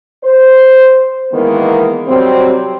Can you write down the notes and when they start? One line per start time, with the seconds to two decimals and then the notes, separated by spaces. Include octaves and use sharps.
0.24 C5
1.33 D#3 E3 G#3 A#3 B3
2.07 C3 F#3 G3 C4